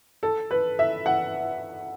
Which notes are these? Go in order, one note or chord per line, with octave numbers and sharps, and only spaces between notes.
A4
B4
E5
F#5